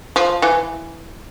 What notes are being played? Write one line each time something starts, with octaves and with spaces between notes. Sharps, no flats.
F3
E3